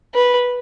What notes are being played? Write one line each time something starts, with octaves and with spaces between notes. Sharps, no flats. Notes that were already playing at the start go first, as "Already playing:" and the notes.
B4